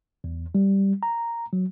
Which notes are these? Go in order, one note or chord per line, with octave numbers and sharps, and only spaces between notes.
E2
G3
A#5
F#3